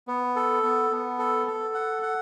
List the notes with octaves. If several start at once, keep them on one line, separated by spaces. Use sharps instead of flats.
B3
A4
B3
B3
A4
A4
F#5
F#5